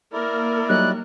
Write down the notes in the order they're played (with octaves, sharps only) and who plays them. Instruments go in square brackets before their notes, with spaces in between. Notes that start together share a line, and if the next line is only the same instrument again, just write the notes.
[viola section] A#3 A#4 [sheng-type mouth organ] E4 D5
[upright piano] F#3 G3 D#4 [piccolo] F#6